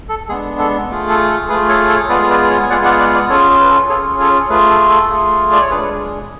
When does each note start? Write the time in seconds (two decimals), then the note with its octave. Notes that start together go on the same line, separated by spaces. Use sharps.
0.09 A4
0.29 G#3 B3 D4 G#4
0.59 A4
0.89 A3 F4 G#4
1.09 A4
1.30 A4
1.49 A3 F4 G#4 B4
1.69 A4 C#5
1.89 A4 C#5
2.09 G#3 B3 F4 G#4 B4 D5
2.23 F5
2.30 B4 D5
2.50 C#5 F5
2.63 G#5
2.70 G#3 B3 F4 G#4 D5 F#5
2.85 D5 F#5
2.99 D5 F#5
3.14 B4 D5
3.30 C#4 F4 G#4 A4 C#5
3.50 G#4
3.61 B4
3.70 A4
3.90 C#4 F4 G#4 A4 C#5
4.20 A4 C#5
4.50 A3 F4 G#4 B4
4.70 A4
4.90 A4
5.10 A3 F4 G#4
5.52 D5
5.62 C#5
5.71 G#3 D4 G#4 B4